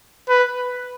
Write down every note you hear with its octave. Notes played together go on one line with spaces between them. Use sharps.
B4